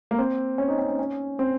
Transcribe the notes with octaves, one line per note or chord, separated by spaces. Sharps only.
A#3
C4
C#4
D#4
C#4
C#4
C#4
C4